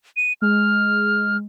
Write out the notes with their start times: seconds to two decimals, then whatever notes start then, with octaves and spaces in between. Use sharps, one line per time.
0.17 D#7
0.42 G#3 F6